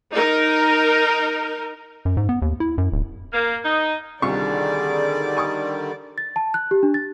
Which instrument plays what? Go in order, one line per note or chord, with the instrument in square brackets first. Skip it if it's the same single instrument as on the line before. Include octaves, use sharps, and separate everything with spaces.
[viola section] D#4 A#4
[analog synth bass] F#2
G#2
B3
D#2
E4
F#2
D1
[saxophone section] A#3
D#4
[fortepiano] C2 F4 C#6 [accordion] D3 D#3 G3 [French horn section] G#4 [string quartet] D5
[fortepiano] G#5 C#6 D#6
[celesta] A6
A5
F#6
G4
D4
A6